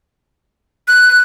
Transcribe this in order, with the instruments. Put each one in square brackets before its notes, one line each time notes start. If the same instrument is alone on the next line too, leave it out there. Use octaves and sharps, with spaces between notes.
[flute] F#6